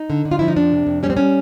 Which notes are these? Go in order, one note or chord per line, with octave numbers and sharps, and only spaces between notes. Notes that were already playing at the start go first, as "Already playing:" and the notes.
Already playing: D#4
D3
D3
F4
F3 E4
D#4
F2 D4
C3
F2
G3 C#4
C4
G3 C#4